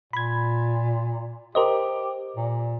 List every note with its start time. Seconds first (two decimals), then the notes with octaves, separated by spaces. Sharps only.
0.13 A#2 B5 G#6
1.55 G4 A#4 C5 D#5
2.36 A#2